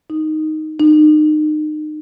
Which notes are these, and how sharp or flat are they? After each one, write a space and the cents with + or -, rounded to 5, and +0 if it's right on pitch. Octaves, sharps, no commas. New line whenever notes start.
D#4 +0
D#4 -30